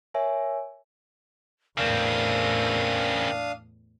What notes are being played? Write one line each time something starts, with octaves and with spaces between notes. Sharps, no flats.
A#4 C#5 E5 G#5
E2 A2 C#3 C4 D4 A#4 F5 D#6